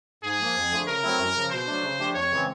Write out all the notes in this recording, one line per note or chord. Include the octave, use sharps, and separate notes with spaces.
G#2 G#4
F3 A#3
F2
D3 F3 A3
C#3 A#4
F#3 A3 C4 E4
F#2
C#3 F3
B2 C5
F#3 A3 D4
C#3
F3 A3 D4 G4
F2 C#5
C#3 E3 G#3 C4